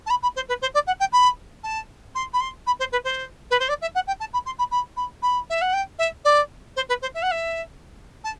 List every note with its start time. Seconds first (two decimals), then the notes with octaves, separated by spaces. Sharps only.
0.06 A5
0.10 B5
0.22 B5
0.36 C5
0.48 B4
0.62 C5
0.74 D5
0.87 F#5
1.00 G5
1.12 B5
1.63 A5
2.15 C6
2.33 B5
2.40 C6
2.66 B5
2.79 C5
2.92 B4
3.04 C5
3.51 B4
3.60 C5
3.69 D5
3.82 E5
3.95 F#5
4.07 G5
4.20 A5
4.33 B5
4.46 C6
4.59 B5
4.71 B5
4.96 B5
5.22 B5
5.50 E5
5.61 F#5
5.73 G5
5.99 E5
6.25 D5
6.76 C5
6.89 B4
7.02 C5
7.14 E5
7.22 F#5
7.31 E5
8.24 A5